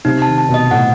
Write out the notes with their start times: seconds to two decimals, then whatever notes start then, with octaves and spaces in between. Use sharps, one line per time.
0.05 C3 D#4
0.22 A5
0.27 D#3
0.38 A5
0.49 B2
0.54 D#5
0.71 A2 F#5